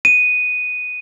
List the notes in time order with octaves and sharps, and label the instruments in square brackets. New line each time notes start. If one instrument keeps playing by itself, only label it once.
[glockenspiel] D#7